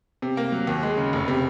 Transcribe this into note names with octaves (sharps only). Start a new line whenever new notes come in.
C3
A#3
F#3
D#2
G#3
C#3
F1
C3